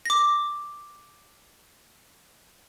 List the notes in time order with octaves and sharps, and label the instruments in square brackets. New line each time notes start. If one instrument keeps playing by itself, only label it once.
[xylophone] D6 A#6